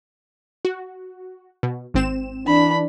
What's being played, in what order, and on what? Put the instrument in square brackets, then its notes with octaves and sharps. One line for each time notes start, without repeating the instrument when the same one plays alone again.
[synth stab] F#4
B2
G#1 C4 E7
[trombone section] E3 D4 [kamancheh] B5